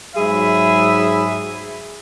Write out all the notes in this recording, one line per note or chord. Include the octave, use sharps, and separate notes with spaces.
G#2 F#3 G#4 E5 B5